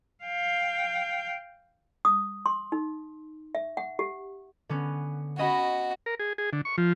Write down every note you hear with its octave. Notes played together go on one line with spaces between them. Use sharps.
F5 G5
D#6
C6
D#4
E5
F#5
G4
D3 B3 C#4
C#4 F#4 D#5 B5
A#4
G#4
G#4
D3
C#6
F3